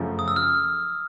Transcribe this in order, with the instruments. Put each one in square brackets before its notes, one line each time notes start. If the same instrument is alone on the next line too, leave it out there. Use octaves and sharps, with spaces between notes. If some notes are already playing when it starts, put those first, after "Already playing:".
Already playing: [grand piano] F#2 C#3 F3 A3
[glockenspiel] D#6
E6
F6